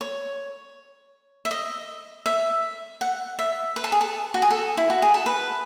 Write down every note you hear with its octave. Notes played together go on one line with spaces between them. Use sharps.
C#5
E5
D#5
E5
F#5
E5
B4
A4
G#4
A4
F#4
G#4
A4
E4
F#4
G#4
A4
B4